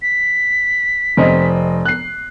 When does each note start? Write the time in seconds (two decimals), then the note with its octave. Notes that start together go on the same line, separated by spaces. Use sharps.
0.02 B6
1.17 F1 C4 D#5
1.85 F#6 C7